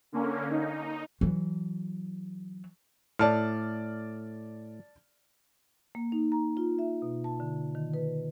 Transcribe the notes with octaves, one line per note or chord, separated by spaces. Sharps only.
D3 A#3 C#4
D#4
E3 F#3
A2 D5 A5 F6
A#3
D#4
A#5
F4
E5
B2
A5
D3
D#3
B4